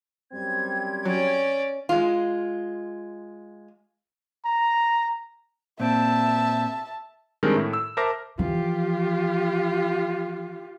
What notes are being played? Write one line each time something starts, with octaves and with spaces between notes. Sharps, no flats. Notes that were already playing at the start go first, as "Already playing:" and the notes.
F#2 G3 C4 G#6
F#3 C#4 D5
G#3 F4
A#5
A#2 C4 E5 A5
D#3 G3 G#3 C4 D4 A#4
A2 A3 E4
E6
A#4 C5 E5 A5 D6 A#6
E3 F3 F4 G4